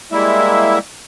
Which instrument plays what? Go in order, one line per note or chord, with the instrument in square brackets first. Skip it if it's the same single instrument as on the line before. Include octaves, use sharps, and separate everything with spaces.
[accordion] G3 G#3 A#3 E4 E5